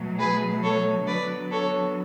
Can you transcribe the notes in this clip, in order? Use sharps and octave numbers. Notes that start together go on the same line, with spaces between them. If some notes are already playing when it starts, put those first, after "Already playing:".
Already playing: B2 F#3 A3
G#4 B4
A4 C#5
D3 F#3 B3 B4 D5
A4 C#5